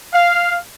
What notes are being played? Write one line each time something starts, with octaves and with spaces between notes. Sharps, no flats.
F5